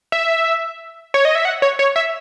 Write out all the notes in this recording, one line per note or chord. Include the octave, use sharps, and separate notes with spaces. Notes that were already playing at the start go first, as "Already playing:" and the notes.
E5
C#5
D#5
E5
F#5
C#5
C#5
E5